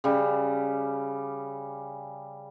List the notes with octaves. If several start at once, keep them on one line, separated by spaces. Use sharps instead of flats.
C#3 G3